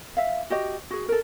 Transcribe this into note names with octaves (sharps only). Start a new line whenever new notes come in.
E5 F5
F#4 G4 D#5
F#4 G#4
A4 A#4